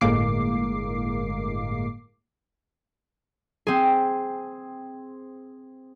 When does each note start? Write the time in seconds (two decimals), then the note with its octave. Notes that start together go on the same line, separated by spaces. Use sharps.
0.01 G1 A2 G#3 A#3 D6 C7
3.67 C4 G#4